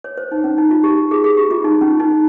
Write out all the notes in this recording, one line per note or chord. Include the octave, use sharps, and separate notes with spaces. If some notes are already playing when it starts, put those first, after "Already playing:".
C#5
C5
D#4
C#4
D#4
F4
G4
G#4
G#4
G4
F4
D#4
C#4
D#4